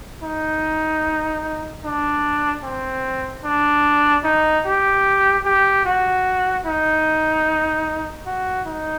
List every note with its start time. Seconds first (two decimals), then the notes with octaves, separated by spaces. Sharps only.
0.23 D#4
1.84 D4
2.64 C4
3.44 D4
4.24 D#4
4.65 G4
5.45 G4
5.85 F#4
6.66 D#4
8.26 F#4
8.67 D#4